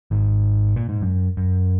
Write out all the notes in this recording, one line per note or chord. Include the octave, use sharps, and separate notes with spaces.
G#1 G#2
A#2
G#2
F#2
F#2